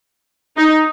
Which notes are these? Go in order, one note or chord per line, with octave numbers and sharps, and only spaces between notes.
D#4